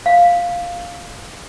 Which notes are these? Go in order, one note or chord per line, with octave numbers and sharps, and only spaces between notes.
F5